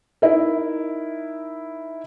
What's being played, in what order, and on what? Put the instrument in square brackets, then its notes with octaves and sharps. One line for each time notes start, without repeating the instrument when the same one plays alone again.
[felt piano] D#4 E4 A#4